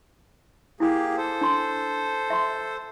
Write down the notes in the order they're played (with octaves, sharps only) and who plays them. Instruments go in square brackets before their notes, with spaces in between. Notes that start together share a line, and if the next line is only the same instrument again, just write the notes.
[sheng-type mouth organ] A#3 G4 G#4 [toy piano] E4 D#6
[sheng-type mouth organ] A4 C5
[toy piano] D4 C6
E5 C6